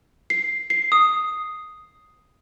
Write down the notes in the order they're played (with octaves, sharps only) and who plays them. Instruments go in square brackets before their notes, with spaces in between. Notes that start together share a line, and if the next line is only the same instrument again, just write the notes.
[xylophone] C7
C7
D#6